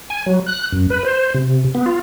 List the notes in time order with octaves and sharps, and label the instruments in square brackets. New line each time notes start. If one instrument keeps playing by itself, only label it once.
[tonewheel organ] G#5
F#3
F#6
F#2
B4
C5
C3
B3
F4